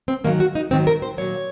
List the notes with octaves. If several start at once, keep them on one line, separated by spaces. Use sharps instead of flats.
C4
G#2 D#3 F#3 A#3
F#4
D#4
G#2 D#3 F#3 C4
A#4
C5
A#2 F#3 C#5